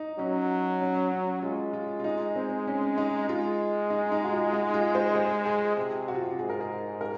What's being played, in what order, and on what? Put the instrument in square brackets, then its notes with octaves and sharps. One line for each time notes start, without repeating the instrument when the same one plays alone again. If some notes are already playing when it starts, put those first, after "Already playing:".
Already playing: [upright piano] D#4
[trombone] F#3 [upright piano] C#4
[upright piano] C#4
C#4
[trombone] G#3 [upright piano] F4
[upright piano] F4
F4
D#4
C4
C#4
D#4
[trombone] G#3 [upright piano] F4
[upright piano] D#4
D#4
F#4
F4
D#4
F4
C5
C5
G#4
[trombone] C3 [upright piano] G#4
[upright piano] F#4
F4
F#4
[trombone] G#2 [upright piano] G#4
[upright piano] A#4
G#4
A#4